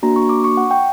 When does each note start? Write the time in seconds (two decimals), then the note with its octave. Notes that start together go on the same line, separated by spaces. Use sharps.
0.03 A#3 D4 F#4 A#5
0.16 C#6
0.29 D6
0.44 C#6
0.57 F#5
0.71 G5